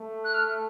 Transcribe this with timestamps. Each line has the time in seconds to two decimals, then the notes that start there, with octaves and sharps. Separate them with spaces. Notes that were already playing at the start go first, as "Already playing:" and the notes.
Already playing: A3
0.24 F#6
0.34 F6